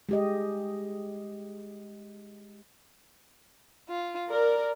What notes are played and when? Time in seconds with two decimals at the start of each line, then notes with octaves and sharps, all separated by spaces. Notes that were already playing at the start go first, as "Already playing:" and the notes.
0.09 G#3 G4 D#5
3.89 F4
4.30 A#4 D5